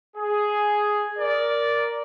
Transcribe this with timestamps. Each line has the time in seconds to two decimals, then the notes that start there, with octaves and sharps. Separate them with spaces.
0.17 G#4
1.19 A#4 D5